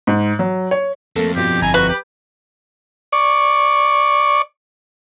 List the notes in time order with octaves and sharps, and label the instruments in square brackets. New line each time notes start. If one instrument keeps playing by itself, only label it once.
[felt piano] G#2
F#3
C#5
[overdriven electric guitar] F2 [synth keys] A3 A#3 A4
[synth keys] G2 B2 F3 [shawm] G4
[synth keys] G1 E4 A#5 [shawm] G#5
[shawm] F#4 [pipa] B4
[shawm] G4
[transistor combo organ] D5 C#6